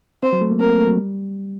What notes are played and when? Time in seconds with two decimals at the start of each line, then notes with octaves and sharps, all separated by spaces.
0.23 C4 C5
0.33 F#3
0.41 A3
0.50 A#3
0.60 C4 A#4
0.69 A#3
0.78 A3
0.88 F#3
0.97 G3